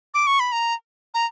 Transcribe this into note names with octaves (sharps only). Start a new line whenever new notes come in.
D6
C#6
B5
A#5
A#5